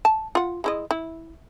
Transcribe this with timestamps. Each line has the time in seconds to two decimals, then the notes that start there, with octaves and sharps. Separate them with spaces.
0.05 A5
0.35 F4 F#5
0.64 G#3 E4 D#5
0.91 E4